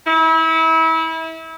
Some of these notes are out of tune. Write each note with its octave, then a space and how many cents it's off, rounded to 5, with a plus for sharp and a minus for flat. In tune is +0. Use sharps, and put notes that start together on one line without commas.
E4 -30